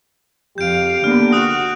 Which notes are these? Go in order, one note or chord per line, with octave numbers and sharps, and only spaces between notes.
F2 G4 F5 G6 D7
D3 A#3 B3 F6
F#4 D#6 F#6 F7